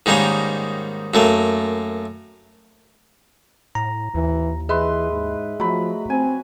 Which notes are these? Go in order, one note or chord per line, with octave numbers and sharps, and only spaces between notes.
G#2 D#3 G3 A#3 C#4
F#2 A3 A#3
A2 A#5
D#2 E3
E3 G#4 B4 D#5 E5 C6
G#2
F3 F#3 A3 B5
C4 G#5